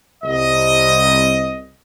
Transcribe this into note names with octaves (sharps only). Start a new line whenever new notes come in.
C2 D#5